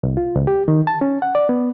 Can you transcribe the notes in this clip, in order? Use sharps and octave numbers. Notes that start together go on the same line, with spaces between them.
C2
F4
C#2
G4
D#3
A5
C#4
F#5
D5
B3